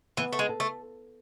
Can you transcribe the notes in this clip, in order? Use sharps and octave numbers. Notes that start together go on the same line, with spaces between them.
E3 B3
A3
G#3
A4
A3